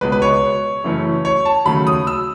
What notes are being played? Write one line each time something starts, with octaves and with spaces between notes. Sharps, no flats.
C#2 B2 G#3 B4
B4
C#5
F#2 C#3 E3 A3 C#4
C#5
A5
D#2 C#3 F#3 A3 B5
D#6
E6